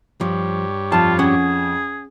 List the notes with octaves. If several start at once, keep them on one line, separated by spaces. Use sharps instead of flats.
G2 F3 G4 C#5
F2 F4 A5
C#4 G#4 F#5